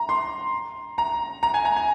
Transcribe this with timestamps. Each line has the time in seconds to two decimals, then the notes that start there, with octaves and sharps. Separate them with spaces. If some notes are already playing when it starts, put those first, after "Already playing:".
Already playing: A#5
0.09 C6
0.98 A#5
1.43 A#5
1.54 G#5
1.65 A#5
1.76 G#5